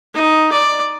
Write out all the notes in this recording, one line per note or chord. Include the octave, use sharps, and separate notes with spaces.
D#4
D5